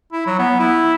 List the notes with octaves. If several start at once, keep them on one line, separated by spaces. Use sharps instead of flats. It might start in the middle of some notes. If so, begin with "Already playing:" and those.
E4
F#3
B3
E4